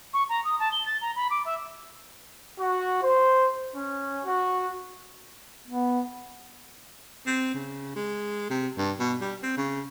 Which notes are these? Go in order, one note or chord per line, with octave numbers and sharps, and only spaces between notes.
C#6
A#5
D#6
A5
G7
A6
A#5
B5
D6
E5
F#4
C5
C#4
F#4
B3
C4
C#3
G#3
C3
G2
B2
G3
C4
C#3